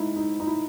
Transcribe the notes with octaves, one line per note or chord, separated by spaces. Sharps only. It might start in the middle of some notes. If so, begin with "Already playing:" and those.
Already playing: G#2 D#4 E4
D#4
D#4
E4